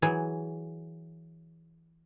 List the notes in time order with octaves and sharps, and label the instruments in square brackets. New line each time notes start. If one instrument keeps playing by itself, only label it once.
[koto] E3 F#3 G#4